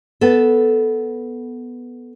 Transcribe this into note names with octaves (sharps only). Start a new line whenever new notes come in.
B3 A4